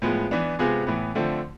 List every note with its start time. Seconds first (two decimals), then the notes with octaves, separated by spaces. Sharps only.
0.02 A2 F3 G#3 B3
0.31 E3 B3 D4
0.59 C3 G#3 B3 F4 G#4
0.87 A2 E3 B3
1.15 D3 F3 A3 C4